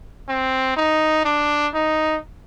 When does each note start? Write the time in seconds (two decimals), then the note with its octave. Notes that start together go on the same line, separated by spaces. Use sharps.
0.29 C4
0.76 D#4
1.25 D4
1.74 D#4